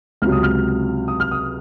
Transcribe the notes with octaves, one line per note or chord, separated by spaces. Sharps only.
C#2 C3 F#3 F6
D#6
F6
D#6
F6
D#6